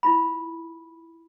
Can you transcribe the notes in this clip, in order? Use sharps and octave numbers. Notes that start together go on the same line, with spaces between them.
E4 F4 B5